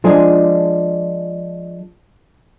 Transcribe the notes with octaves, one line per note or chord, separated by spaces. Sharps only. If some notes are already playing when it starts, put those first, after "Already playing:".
F3 G#3 D4 G#4